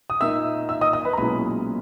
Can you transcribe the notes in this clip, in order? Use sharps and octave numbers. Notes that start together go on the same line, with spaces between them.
D#6
A#2 A#3 D#4 E5 E6
E5 E6
D#5 D#6
D#5 D#6
B4 B5
A#5
B1 A#2 G#3 C#4 E4 B4 B5